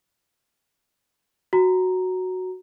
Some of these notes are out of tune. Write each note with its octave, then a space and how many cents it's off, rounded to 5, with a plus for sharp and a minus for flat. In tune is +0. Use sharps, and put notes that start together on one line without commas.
F#4 +0 A#5 +0